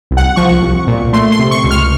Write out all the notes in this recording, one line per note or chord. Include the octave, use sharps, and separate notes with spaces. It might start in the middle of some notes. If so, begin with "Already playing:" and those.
C2
F#5
F3 C#6
C2
A#2
A3 C6
C6
C3
C#6
C#2
F6